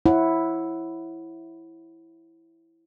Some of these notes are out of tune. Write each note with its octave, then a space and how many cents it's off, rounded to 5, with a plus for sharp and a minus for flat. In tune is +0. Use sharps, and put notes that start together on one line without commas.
E4 +0 C#5 -40 F#5 +0